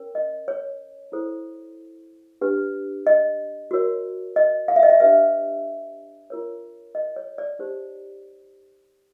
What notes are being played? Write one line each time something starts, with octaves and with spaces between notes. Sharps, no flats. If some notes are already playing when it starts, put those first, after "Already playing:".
Already playing: C#4 A#4 C#5
D#5
C#5
E4 A4 C5
D4 G4 B4
D#5
F#4 A#4 C#5
D#5
F5
E5
D#5
E5
D4 G4 B4 E5
F4 A#4 C#5
D#5
C#5
D5
D#4 G4 C5